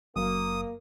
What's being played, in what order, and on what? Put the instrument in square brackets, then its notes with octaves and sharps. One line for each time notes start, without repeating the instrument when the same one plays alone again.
[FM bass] F#1 [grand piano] F#2 [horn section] A#3 [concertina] D#6